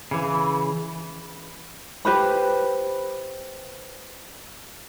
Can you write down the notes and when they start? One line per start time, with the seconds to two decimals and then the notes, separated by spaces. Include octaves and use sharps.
0.11 C#3 E3
2.05 G4 B4 C5 B5